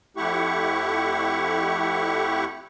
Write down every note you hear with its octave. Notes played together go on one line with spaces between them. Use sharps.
F2 A3 E4 G4 F#5 C#6